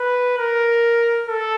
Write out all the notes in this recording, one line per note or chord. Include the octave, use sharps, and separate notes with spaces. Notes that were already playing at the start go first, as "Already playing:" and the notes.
Already playing: B4
A#4
A4